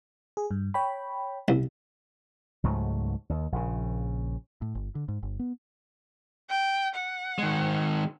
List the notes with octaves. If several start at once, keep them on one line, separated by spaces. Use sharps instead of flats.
G#4
G2
C#5 G5 B5
C2
C#2 G#2 F#3 A3
D#2
A#1 C#3
A2
G1
D3
G#2
G1
B3
G5
F#5
D#3 G#3